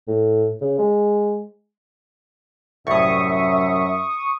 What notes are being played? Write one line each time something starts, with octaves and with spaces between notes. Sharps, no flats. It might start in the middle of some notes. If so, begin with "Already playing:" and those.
A2
C#3
G#3
C2 F#2 A2 E5 C#6 D#6